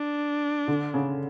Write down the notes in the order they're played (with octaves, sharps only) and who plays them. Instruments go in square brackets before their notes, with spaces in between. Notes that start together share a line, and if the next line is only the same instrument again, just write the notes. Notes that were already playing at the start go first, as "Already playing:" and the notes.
Already playing: [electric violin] D4
[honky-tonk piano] D3
C#3